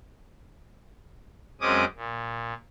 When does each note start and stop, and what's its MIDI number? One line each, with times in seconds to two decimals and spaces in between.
1.61 1.85 42
1.61 1.85 56
1.61 1.85 60
1.61 1.85 61
1.61 1.85 86
1.61 1.85 87
1.96 2.53 46